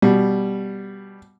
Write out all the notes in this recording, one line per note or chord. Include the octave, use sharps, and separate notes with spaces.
B2 G3